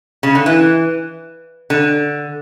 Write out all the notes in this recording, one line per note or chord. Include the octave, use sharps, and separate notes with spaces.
C#3
D3
E3
D3